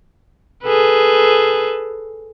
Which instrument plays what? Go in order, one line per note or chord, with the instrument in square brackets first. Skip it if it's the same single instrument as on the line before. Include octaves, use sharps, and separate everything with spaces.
[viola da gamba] G#4 A4 B4